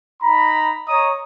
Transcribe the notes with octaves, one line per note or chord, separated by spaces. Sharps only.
D#4 A#5 B5
C#5 D#5 A#5 D#6